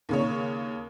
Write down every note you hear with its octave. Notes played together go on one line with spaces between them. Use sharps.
D#2 C#3 C#5